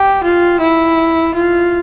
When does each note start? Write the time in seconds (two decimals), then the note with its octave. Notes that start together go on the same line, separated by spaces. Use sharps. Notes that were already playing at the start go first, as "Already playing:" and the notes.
Already playing: G4
0.24 F4
0.61 E4
1.35 F4